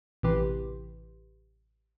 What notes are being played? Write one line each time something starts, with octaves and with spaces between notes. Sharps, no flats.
A1 C3 E3 G4 B4 C6